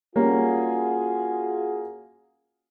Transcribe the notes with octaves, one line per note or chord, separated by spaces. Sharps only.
G3 A#3 C#4 F4 F#4 G#4